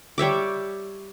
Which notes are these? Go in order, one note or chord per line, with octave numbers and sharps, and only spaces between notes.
G3 C#5 E5 D6